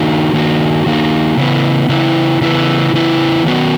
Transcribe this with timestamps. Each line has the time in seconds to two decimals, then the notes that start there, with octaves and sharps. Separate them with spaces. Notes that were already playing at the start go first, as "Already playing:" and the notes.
Already playing: D#3 A#3 D#4 F#4
0.33 D#3 A#3 D#4 F#4
0.86 D#3 A#3 D#4 F#4
1.37 C#3 E3 B3 E4
1.89 C#3 E3 B3 E4
2.41 C#3 E3 B3 E4
2.93 C#3 E3 B3 E4
3.45 D#3 F#3 B3 F#4